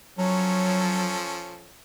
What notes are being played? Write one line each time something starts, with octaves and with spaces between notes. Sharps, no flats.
F3 F#3 C#4 A4